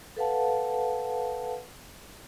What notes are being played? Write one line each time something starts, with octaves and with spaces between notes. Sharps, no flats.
A4 B4 F5 F#5 A5